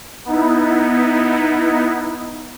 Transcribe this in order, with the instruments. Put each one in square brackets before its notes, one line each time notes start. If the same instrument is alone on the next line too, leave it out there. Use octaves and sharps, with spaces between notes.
[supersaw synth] B3 D#4 E4